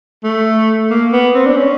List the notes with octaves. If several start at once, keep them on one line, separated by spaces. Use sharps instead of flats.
A3
A#3
B3
C4
D4
C#4